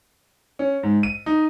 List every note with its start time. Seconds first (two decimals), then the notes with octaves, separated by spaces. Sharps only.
0.59 C#4
0.83 G#2
1.03 D#7
1.26 D#4